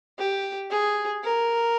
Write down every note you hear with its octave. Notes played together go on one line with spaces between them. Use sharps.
G4
G#4
A#4